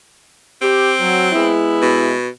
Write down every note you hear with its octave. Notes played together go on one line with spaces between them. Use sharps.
C4 G4
F#3
G#3 B3 E4
B2